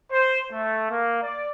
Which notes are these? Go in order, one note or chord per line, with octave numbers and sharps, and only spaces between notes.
C5
A3
A#3
D5